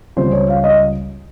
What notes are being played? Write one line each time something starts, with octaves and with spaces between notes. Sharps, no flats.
C#2 C#3 G3 C#4 F4 C5
C#5
F5
D#5